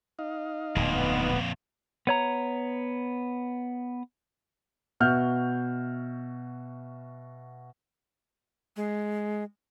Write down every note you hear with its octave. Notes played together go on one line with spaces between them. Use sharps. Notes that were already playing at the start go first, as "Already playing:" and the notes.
D#4 D#5 F5
D1 F2 A#2 B3
B3 C#5 A#5
B2 F#4 E5 F6 G6
G#3